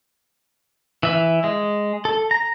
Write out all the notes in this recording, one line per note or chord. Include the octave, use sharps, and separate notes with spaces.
E3 E5
G#3
A4
A#5